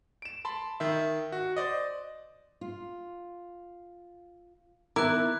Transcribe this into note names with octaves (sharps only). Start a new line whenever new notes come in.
D7 E7
A5 B5 C6
D#3 E5
F#4
C5 D5 D#5
F4
D#3 B3 E4 A#4 D6 F#6